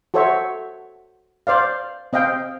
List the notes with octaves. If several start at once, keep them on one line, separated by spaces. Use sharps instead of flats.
F#4 A4 C5 C#5 E5
C5 D5 F5
C4 D#5 F5 G5